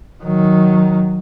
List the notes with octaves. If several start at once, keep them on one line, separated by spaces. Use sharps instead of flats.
D#3 F#3